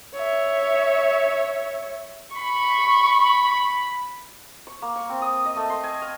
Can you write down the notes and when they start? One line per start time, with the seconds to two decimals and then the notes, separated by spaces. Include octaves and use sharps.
0.14 C#5 E5
2.36 B5 C#6
4.67 C#6
4.82 A#3
4.96 C#6
5.10 C4
5.22 D#6
5.45 D#5
5.57 A3
5.70 C6
5.84 G#5
6.02 F5